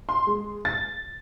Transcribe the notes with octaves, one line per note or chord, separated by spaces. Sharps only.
C6
G#3
A6